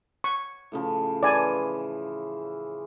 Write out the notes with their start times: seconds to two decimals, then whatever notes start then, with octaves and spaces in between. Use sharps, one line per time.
0.24 C#6
0.72 A2 C#3 F3
1.23 E3 F3 D5 G#5